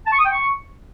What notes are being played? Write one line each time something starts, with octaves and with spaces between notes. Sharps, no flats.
A5
C#6
D#6
G5
C#6